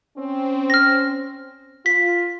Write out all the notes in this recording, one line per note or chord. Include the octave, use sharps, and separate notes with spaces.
C4 C#4
F6 A#6
F4 B6